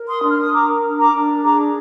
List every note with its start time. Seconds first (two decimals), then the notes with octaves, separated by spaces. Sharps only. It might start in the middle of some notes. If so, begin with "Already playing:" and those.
Already playing: A#4
0.08 C6 D#6
0.23 D4
0.29 F6
0.42 D#6
0.53 A#4 A#5 D6
0.83 D4
0.98 A#5 D6
1.13 D4
1.44 G#4 A#5 D6